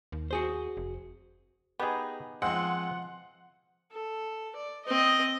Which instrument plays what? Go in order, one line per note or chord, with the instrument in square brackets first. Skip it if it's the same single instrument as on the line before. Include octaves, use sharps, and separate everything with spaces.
[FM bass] D#2
[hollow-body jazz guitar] F#4 G#4 C5
[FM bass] F1
[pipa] B3 D#4 [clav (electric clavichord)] G4 G#4
[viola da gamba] F3 [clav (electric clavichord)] G#3 C4 [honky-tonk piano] F#5 C6
[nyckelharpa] A4
D5
C4 D#5